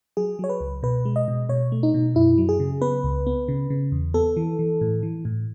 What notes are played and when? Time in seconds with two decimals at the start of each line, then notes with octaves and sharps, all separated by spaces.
0.17 F#3 G#4
0.39 F#3 C#5
0.49 B4
0.61 C#2
0.83 B2 B4
1.05 G#3
1.16 D#5
1.28 B2
1.49 B2 C#5
1.72 A3
1.83 D#4
1.94 B2
2.15 F#2 E4
2.38 F#3
2.49 G#4
2.60 C#3
2.82 B3 B4
3.04 C#2
3.27 B3
3.48 C#3
3.70 C#3
3.92 E2
4.14 B3 A4
4.37 E3
4.59 E3
4.81 A2
5.03 E3
5.25 A2